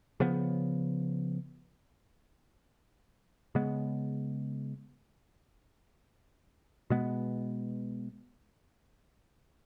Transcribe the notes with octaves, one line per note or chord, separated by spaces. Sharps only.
C#3 F3 B3
C#3 G#3 B3
B2 G#3 B3